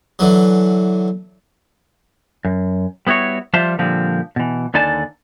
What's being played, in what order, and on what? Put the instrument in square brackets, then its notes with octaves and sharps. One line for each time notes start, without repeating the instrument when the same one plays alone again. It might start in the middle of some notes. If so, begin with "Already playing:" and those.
[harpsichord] D3 E3 F#3
[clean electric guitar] F#2
G3 B3 E4 F#4 C#5
F3 G3 F4 C5 E5 A5
A#2 D3 F3 G3 C4
B2 E3
D#2 D3 D#4 D5 G#5 A5